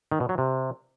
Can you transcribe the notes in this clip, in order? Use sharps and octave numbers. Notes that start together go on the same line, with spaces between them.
D#3
B2
F#3
C3